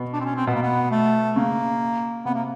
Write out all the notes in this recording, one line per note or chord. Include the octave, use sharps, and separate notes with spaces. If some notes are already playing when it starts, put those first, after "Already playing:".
Already playing: B2
D4
C4
C#4
C4
B2 B3
A#3
B3
A3
C#3 A#3
C3 B3
A#3